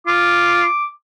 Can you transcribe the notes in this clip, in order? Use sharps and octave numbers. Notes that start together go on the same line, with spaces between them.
F4 D6